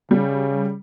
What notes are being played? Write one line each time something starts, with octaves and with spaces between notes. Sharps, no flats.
C#3 G3